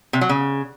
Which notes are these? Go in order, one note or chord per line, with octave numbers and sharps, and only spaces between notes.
C3
F#3
C#3